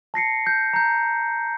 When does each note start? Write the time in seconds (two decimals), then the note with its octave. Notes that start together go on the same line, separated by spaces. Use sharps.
0.14 A5 A#6 C7 C#7
0.47 G6
0.74 A#5 G6